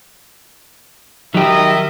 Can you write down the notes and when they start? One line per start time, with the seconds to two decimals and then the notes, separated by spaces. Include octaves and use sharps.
1.35 D#3 F#3 G4 D#5 E5